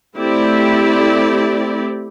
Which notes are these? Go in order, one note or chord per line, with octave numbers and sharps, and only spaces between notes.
A3 C4 E4 G4 D5